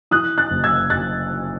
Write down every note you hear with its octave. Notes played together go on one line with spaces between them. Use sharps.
E3 D#6 F#6
F#6 A6
F#1
E6 G#6
F#1 F#6 A6